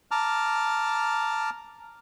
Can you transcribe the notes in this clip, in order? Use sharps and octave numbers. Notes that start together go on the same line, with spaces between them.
A5 A#5 D6 F6